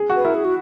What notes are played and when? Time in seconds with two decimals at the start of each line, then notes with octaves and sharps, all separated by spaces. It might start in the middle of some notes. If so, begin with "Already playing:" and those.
Already playing: G#4
0.10 F#4
0.16 B4
0.25 E4 A#4
0.34 G#4
0.45 F#4